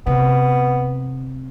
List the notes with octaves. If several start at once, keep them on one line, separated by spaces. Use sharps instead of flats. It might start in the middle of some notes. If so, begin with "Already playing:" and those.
C3 B3